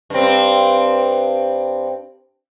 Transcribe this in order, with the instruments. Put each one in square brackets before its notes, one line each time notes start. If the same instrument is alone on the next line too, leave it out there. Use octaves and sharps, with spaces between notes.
[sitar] G2 C4